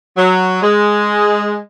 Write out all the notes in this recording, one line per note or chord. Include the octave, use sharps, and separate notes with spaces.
F#3
G#3